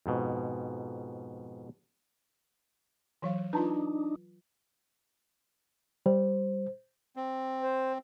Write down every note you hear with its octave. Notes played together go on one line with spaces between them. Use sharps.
F2 G#2 B2
E3 F#3 F5
D4 D#4 F4 B4
G3 C5
C4
C5